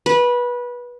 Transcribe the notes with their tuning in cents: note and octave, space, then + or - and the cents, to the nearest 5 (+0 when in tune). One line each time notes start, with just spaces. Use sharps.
B4 -20